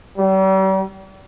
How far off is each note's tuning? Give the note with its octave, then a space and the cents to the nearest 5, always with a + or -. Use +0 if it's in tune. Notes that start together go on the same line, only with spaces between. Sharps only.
G3 -40